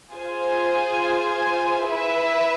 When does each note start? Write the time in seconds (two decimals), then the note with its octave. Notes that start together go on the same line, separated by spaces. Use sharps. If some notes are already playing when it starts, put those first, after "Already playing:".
0.12 F4 G#4 C5 G#5
1.89 E4 B4 E5